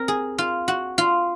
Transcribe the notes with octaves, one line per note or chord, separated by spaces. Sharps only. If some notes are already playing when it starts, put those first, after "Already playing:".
Already playing: C4 A#4
G#4
F4
F#4
F4